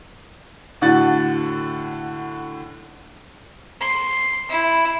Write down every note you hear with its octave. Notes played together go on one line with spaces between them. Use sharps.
A2 D3 F#4 F#5 F#6 A6
C6
E4